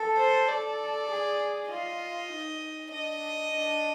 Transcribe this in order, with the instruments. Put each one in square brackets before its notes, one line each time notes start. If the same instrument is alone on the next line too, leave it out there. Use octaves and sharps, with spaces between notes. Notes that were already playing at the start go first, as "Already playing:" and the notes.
Already playing: [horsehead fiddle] A4
[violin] C5
[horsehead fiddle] A4 [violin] D5
[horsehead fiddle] G#4
[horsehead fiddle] F4 [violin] D#5
[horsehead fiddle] D#4
[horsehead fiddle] D4 [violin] D#5
[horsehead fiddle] D4